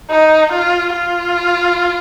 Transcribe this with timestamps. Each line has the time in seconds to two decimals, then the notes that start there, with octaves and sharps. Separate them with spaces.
0.10 D#4
0.52 F4
0.93 F4